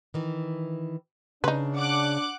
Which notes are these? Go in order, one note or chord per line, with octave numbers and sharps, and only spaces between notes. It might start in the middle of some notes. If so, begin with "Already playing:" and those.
D#3 E3
C#3 D4 D#4 B4
F#5 D6 F#6